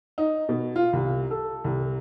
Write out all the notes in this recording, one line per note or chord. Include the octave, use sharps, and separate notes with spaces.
D#4
B2
F4
C2
A4
C2